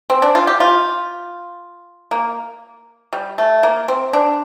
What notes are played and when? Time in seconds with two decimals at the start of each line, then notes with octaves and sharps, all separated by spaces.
0.10 C4
0.22 D4
0.35 F4
0.47 G4
0.60 F4
2.11 A#3
3.13 G3
3.38 A3
3.63 A#3
3.88 C4
4.13 D4